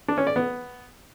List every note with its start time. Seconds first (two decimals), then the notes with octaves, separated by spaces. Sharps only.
0.08 D4
0.18 C#4
0.27 D5
0.36 B3